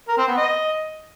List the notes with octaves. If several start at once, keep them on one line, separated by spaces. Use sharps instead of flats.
A#4
C4
B3
D#5